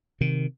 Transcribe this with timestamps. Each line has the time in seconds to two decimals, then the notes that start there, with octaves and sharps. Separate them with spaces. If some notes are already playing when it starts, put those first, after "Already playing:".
0.21 C3 D#3